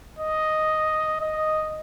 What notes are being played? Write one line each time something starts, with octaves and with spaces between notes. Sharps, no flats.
D#5
D#5